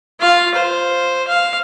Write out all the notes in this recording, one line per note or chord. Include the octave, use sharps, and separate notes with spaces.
F4 F5
C5
F5